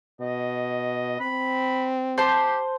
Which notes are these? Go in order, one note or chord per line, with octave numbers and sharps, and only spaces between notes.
B2 D#5
C4 B5
G4 C5 A5 C6